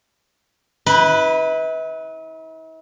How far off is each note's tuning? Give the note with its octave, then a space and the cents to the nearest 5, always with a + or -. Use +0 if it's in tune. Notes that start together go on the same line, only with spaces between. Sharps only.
E4 -45 B4 +0